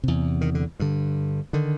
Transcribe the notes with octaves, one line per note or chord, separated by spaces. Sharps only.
E2 C3
D#3
D3
G2 D3
D3 D#3